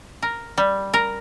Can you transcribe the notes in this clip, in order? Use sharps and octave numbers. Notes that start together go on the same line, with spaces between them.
A#4
G3
A#4